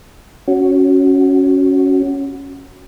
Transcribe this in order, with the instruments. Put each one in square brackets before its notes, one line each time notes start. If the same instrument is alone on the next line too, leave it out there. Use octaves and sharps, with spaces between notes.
[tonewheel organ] C#4 F#4